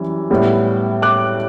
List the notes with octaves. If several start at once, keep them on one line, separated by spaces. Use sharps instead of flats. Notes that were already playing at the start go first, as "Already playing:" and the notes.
Already playing: F#2 E3 G3
A2 G3 B3
D6 F#6